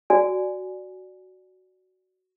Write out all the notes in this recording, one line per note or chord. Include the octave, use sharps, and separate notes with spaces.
F#4 D5 G#5